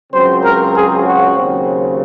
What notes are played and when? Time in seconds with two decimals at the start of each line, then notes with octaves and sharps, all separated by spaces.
0.12 C#2 C#3 F#3 C4 C5
0.43 A#4
0.74 G#4
1.05 F#4
1.36 D#2 C#3 F#3 C4